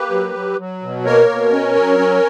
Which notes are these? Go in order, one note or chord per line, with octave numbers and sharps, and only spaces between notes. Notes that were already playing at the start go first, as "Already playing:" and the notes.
Already playing: A#3 G4 B4
F#3
F#3
F#3
B2
A#3 A#4 C#5
B2
C#4
F#3
C#4